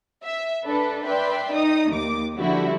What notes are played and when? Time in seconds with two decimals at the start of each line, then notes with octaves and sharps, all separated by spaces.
0.23 E5
0.66 D4 A4 B4
1.06 B4 D5 E5 G5 C6
1.54 D#4 D#6
1.91 D#2 D6
2.38 D3 F3 G3 E4 F#4